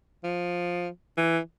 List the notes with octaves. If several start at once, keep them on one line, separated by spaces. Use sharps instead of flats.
F3
E3